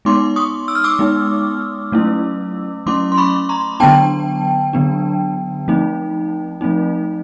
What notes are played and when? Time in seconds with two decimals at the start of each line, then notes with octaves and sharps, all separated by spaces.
0.05 G#3 B3 D#4 C6 D6
0.36 C#6 D#6
0.68 E6
0.75 F6
0.84 D6 E6
0.99 G#3 B3 D#4
1.92 F#3 A3 C#4 E4
2.86 F#3 A3 C#4 E4 C6 D6
3.12 C6
3.18 B5 C#6
3.49 A#5 C6
3.80 D3 F#3 B3 D4 G5 A5
4.73 D3 F#3 B3 D4
5.68 F3 A3 C4 D#4
6.61 F3 A3 C4 D#4